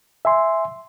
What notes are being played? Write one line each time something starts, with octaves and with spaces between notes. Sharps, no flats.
E5 G#5 C6